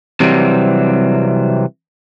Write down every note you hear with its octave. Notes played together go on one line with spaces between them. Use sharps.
C3 E3 F#3 G3 C4